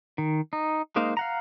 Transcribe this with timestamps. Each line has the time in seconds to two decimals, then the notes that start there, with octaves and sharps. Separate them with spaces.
0.18 D#3
0.53 D#4
0.96 G#3 A#3 D#4 C5 F5
1.17 F5 F#5 A#5